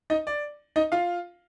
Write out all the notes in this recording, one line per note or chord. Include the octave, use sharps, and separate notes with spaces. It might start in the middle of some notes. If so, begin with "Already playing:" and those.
D#4 D#5
D5
D#4 D#5
F4 F5